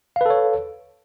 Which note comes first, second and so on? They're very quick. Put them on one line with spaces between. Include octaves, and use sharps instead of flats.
F5 B4 A4 C#5